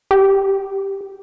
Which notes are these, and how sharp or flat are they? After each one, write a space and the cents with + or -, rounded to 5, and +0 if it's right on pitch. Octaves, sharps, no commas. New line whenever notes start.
G4 +0